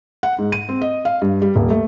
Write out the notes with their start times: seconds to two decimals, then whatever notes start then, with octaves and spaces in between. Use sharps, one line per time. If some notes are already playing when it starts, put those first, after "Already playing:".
0.23 F#5
0.38 G#2
0.52 D#7
0.69 C4
0.81 D#5
1.05 F5
1.22 G2
1.42 G3
1.56 D#1
1.70 A3